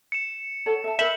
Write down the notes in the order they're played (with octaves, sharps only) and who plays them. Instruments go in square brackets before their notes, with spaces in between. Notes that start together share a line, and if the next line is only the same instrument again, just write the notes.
[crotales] C#7 E7
[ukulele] A4 C#5 F#5
E5 A5
[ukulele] A#4 B5 [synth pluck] E5 [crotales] G6 F#7